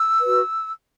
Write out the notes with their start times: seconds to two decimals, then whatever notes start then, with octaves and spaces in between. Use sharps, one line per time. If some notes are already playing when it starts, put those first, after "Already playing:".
Already playing: E6
0.20 F#4 B4